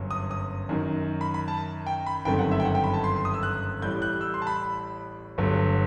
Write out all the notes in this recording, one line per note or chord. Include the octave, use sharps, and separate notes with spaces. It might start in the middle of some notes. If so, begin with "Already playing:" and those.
Already playing: G1 F#2 F#3
D#6
D#6
F#2 D#3 F#3
B5
B5
A5
G5
B5
G1 F#2 D#3 A3 C4 G5
F#5
E5
G5
F#5
G5
B5
A5
C6
C6
D#6
E6
F#6
A1 A2 G3 G6
F#6
E6
C6
A5
B5
G1 G2 F#3 A3